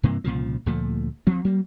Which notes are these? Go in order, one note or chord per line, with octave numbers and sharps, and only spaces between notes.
G2 C3 E3 A#3
C2 A#2 C#3 F3
D2 A#2 F3 A3
D2 F3 C4
F#3 G3 A#3